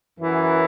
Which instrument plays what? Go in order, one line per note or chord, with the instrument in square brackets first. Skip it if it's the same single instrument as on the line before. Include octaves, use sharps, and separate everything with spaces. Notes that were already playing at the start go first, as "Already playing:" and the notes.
[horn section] F#2 E3